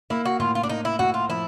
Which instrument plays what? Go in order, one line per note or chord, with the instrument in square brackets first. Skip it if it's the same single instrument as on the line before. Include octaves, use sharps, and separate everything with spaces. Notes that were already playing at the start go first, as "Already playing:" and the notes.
[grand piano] A#3 [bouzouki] E4
[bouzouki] F#4
[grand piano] A2 [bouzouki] F4
[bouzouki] F4
D4
[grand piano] A#3 [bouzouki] D#4
[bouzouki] E4
[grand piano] A2 [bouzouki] F#4
[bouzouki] F4
[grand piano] F3 [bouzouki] E4